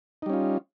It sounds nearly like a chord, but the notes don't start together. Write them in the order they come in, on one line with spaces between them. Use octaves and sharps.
D#4 G3 C#4 F4